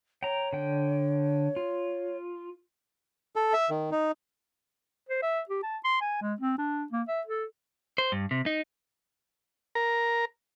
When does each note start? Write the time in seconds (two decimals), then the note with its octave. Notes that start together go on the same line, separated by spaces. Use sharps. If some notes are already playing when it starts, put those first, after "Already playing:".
0.23 C#5 G5 A#5
0.53 D3 G5
1.56 F4
3.36 A4
3.53 E5
3.70 D#3
3.91 D#4
5.09 C5
5.22 E5
5.49 G4
5.63 A5
5.84 C6
6.01 G#5
6.21 G#3
6.41 C4
6.58 D4
6.92 A#3
7.08 E5
7.27 A4
7.98 C5
8.12 G2
8.31 C3
8.46 D#4
9.75 A#4 A#5